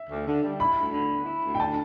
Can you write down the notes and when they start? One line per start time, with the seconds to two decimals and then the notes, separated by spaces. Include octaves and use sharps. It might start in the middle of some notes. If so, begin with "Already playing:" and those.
Already playing: E5
0.10 D2
0.27 D3
0.43 G3
0.60 E4 B5
0.77 D2
0.93 D3
1.10 B3
1.26 E4
1.43 D2
1.55 G5
1.60 D3 A5